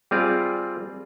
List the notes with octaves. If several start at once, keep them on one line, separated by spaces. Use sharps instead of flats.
G3 C4 F4 G#4 D5 F5